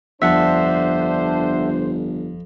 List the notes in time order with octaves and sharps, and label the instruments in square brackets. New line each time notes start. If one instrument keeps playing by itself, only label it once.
[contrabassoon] G1 [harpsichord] F2 [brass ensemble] D4 C5 [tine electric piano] E5 F#5 A5